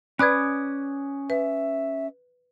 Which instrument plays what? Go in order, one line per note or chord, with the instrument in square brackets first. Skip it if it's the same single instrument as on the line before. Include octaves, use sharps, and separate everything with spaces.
[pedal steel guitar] C#4 D6 D#6 [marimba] B4 D5 B5 [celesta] F#6 G#6
[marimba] B4 [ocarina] E5